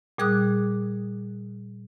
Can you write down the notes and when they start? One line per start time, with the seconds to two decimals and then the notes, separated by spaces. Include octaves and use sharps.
0.18 A#2 G3 G#4 D6 D#6 F#6